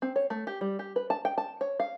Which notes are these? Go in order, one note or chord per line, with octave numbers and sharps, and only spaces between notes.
C4
C#5
A3
G4
G3
G4
B4
A5
G5
A5
C#5
F5